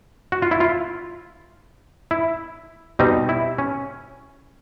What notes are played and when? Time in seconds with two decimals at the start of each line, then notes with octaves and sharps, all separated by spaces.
0.32 F#4
0.42 F4
0.51 E4
0.60 F4
2.11 E4
2.99 B2 G3 C4 D#4
3.29 E4
3.58 C#4